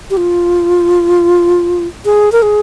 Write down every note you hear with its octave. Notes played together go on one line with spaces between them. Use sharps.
G4
F4
G#4
A#4
G#4